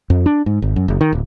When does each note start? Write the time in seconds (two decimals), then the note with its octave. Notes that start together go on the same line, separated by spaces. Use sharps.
0.10 F2
0.26 D4
0.46 G#2
0.62 G#1
0.76 F#2
0.88 F#1
1.01 D#3
1.13 D1